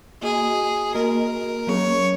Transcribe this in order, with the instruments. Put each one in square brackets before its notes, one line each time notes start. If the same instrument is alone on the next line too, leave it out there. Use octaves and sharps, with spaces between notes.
[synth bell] A#3 F#4 D#5 [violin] G#4
[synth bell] A#3 F#4 D#5 [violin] A#4
[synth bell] F#3 A#3 C#4 G#4 [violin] C#5